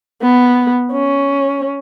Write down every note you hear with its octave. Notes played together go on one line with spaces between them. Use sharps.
B3
C#4